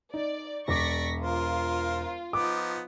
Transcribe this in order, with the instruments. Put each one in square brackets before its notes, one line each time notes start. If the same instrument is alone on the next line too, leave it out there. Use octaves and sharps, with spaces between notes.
[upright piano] D#4 [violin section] D5
[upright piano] E1 D6 [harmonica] D5 [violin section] C#6 A#6 B6
[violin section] F4 [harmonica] A#4 C5
[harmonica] F3 B3 D#4 [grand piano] D6